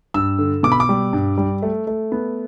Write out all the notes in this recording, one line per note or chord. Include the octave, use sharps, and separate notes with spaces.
G2 E6
D3
B2 D6
B5
D6
G3
G2
G3
A3
A3
B3